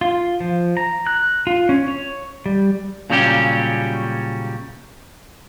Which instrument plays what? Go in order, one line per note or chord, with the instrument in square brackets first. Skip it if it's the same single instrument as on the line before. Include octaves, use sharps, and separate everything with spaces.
[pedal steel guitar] F4
F3
A#5
F#6
F4
C#4
C#5
G3
[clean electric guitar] A#2 C#3 F#3 G3 C#4 G4